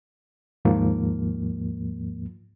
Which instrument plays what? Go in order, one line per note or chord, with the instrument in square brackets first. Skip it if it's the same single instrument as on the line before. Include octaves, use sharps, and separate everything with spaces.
[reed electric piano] D#2 G#2 F3 A#3